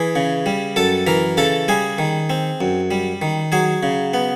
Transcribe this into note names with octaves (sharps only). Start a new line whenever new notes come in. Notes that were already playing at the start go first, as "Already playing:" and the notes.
Already playing: E3 G#4 G#5
C#3
G3
F#2 A4 A5
E3 A#4 A#5
C#3 A4 A5
G3 G#4 G#5
D#3
C4
F#2
G3
D#3
F#3 G#4 G#5
C#3
B3